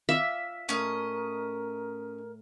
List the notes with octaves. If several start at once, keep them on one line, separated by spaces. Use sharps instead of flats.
F4 D5 E5 F5
A2 C#4 A#4 D#5